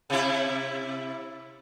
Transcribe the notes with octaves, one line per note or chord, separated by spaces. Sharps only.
C3 E4